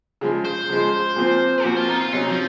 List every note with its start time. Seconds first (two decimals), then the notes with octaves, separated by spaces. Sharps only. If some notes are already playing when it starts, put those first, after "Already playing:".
0.21 C#3 F3 G#3
0.45 C5
0.70 C#3 F3 G#3
1.16 A#2 F3 C4
1.64 A#2 F3 C4 F#4
1.76 F4
1.89 D#4
2.00 F4
2.12 C3 F#3 C#4 D#4
2.29 F3